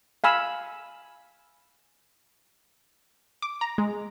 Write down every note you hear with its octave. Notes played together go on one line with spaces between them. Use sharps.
F5 G#5 B5 E6
D6
A#5
G#3